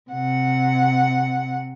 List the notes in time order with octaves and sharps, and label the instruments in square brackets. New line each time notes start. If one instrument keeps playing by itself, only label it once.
[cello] C3 F#5